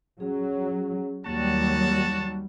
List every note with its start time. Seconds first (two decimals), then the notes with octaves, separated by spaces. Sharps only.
0.20 F#3 C#4 G#4
1.25 D#2 F#3 G3 A#3 F#4 A5